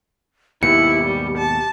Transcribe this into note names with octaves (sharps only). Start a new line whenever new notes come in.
D#2 G#2 B2 E4 G4 C#7
G3
A5